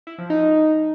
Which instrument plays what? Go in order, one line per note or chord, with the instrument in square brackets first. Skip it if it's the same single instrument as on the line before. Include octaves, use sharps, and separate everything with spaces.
[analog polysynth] E4
F3
D#4